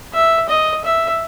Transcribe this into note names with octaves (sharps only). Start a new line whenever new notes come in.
E5
D#5
E5